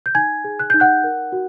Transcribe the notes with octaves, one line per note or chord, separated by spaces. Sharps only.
G6
D#4 G#5 G#6
G#4
F#6
D#4 G6
F#5 F#6
A#4
F#4